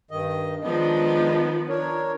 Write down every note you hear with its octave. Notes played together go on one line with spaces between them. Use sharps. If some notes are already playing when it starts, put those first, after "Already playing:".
G2 D#3 D#5
D#3 F3 G#3 B3 D4 D#5
D4 A#4 C#5